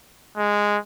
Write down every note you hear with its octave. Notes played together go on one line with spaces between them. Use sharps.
G#3